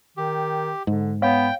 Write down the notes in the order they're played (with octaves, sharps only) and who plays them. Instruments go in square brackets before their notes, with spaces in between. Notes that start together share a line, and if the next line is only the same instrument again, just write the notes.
[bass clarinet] D#3 [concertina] G4
[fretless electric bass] G#2 [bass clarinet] D3
[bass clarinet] B3 [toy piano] C#5 F5 [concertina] G5